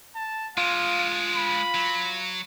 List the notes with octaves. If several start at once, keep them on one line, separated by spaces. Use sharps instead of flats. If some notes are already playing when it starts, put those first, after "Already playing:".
A5
G#3 D4 F4 F5
B5
F#3